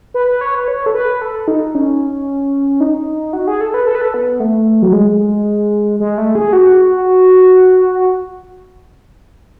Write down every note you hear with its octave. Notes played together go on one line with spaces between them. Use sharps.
B4
B4
C#5
B4
C#5
A4
B4
A4
D#4
C#4
D#4
F#4
G#4
A4
B4
A4
B4
A4
B3
A3
F#3
G#3
G#3
A3
G#4
F#4